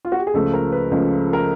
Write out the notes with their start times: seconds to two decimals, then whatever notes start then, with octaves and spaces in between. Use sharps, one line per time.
0.05 F4
0.12 F#4
0.19 G4
0.27 G#4
0.34 C#2 C#3 F3 A3 A4
0.54 A#4
0.72 B4
0.91 C#2 C#3 F3 A3
1.33 A#4